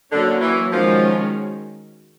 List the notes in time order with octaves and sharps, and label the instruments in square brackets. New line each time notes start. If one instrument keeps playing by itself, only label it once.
[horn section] D3 [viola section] F#3 A#3 C#4 F#4
[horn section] E3
[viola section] D#3 G#3 C#4 F#4 [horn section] F3